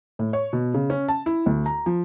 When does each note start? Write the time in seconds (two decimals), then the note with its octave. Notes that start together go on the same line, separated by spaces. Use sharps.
0.19 A2
0.33 C#5
0.53 B2
0.74 C#3
0.90 C#4
1.08 A5
1.26 E4
1.46 D2
1.66 A#5
1.86 F3